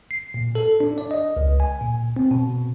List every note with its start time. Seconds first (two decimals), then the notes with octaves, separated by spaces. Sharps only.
0.11 C7
0.34 A#2
0.55 A4
0.80 D4
0.98 D5
1.11 D#5
1.37 C#2
1.60 G#5
1.81 A#2
2.16 C4
2.31 B2